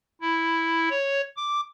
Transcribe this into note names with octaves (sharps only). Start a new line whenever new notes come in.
E4
C#5
D6